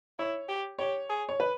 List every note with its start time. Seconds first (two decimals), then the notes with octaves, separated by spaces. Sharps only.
0.19 E4 C#5
0.49 G4
0.79 G4 C#5
1.09 G#4
1.29 C#5
1.40 B4